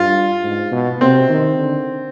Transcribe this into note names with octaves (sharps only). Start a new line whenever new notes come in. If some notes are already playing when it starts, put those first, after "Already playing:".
Already playing: G2 F4
G#2
B2
C3 C4
D#3
D3